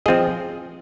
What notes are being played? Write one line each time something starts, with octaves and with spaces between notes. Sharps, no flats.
F3 C4 F4 G#4 D#5